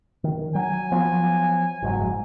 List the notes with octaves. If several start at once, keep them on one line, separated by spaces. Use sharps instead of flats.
D#3
F#3 G#5
F3 F#3 B3
F#1 G#2 F#3